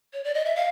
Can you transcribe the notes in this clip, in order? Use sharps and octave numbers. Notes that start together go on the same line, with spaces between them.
C#5
D5
D#5
E5
F5